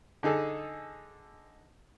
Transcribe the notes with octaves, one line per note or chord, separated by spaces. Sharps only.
D3 D#4 G#4 A4